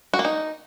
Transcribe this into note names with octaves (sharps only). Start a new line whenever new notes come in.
F#4
A#3
D#4